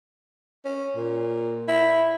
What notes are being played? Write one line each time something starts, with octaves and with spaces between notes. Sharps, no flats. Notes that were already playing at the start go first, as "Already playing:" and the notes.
C#4
A#2
E4